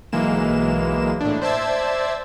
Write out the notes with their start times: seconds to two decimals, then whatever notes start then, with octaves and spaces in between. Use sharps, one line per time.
0.12 B1 E3 G#3 A#3 E7
1.21 A2 D4
1.42 C5 D5 E5 A5 E6 G#6